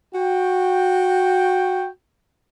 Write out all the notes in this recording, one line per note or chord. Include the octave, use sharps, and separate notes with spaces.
F#4 G5